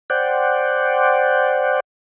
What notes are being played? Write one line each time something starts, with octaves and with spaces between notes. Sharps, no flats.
C5 D5 F#5 G5